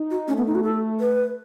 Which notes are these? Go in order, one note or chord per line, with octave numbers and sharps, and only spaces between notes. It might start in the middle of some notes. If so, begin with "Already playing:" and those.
Already playing: D#4
F#4
A3 C#4
B3
D#4
F#4
A4
B4